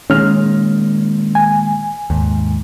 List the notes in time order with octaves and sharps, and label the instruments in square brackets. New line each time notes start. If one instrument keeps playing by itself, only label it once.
[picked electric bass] A#2 D#3 G#3 [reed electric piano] C#4 F6
[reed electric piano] G#5
[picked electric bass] D#2 G#2